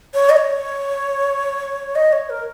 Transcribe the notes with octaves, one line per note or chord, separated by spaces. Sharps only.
C#5
D#5
C#5
D#5
C#5
A#4